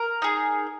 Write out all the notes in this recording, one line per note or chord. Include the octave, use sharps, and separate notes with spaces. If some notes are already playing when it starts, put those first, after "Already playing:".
Already playing: A#4
D#4 G#4